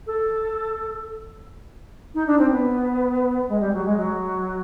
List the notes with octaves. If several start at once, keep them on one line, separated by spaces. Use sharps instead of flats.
A4
D#4
D4
C4
B3
G#3
G3
F#3
G#3
F#3